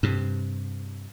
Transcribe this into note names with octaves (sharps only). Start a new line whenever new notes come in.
G2 C3